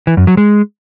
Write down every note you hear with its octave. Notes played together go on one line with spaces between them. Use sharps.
E3
F#2
F#3
G#3